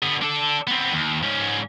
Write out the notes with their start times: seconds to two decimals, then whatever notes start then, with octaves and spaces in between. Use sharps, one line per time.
0.03 D3 B3
0.22 D4 A4
0.67 B3 C4
0.92 D#2
1.22 G#2 C#4